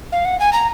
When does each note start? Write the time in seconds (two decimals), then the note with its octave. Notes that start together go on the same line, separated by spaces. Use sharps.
0.12 F5
0.25 F#5
0.40 G#5
0.53 A#5